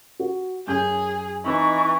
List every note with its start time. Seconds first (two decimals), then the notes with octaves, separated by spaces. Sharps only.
0.19 F#4
0.67 F#2 G#4 G6
1.45 E3 C4 D#4 C#6